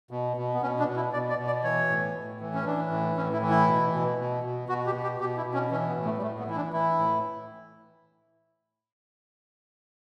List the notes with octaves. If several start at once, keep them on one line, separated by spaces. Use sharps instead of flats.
B2
B2
B3
B2 C#4
D4
B2
E4
B2 D5
D5
B2
D5
E3 C#5
A2
A2
E3
C#4
E3 D4
A2
A2 C#4
E4
E3
E4
B2
B2
B2
B2
B2 F#4
G4
B2
G4
B2 G4
E4
B2
C#4
E3 C#4
B3
A2
A3
G3
A2 A3
B3
E3 E4
D4
E3 E4
A2